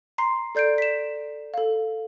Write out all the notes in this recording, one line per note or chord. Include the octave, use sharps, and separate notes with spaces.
A#5 C6 C7
A4 D5 G6 C7 D7
B6 E7
A4 F5